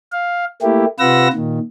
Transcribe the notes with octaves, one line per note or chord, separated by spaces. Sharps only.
F5
A3 A#3 E4 G4
C3 F4 B4 F#5 E6 A#6
A#2 D#3